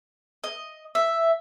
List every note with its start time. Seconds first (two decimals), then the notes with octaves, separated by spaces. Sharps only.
0.44 D#5
0.95 E5